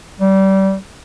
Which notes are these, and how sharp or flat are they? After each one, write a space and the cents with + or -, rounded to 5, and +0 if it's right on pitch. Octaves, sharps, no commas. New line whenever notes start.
G3 -25